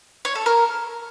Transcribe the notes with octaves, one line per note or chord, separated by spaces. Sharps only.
C#5
A4
A#4